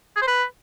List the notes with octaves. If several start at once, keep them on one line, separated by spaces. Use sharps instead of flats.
G#4
C5
B4